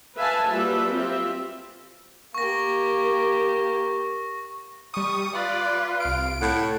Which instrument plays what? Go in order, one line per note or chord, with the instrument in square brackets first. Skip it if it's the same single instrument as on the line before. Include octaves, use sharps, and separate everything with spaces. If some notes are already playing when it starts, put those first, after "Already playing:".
[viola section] B4 E5 F5 G#5 A5
F#3 G3 A#3 F4 B4 E5
C4 F4 G4 E5
[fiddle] A#3 G4 [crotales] C#6 A#6
[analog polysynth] G3 D#6 [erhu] C#6
[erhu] F4 [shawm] B4 [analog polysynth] D5
[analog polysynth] C2 D7 [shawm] F5
[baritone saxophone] A2 [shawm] F#5